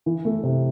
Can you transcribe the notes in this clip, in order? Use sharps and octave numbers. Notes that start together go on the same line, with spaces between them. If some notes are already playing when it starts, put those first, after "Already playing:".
E3
A3
C3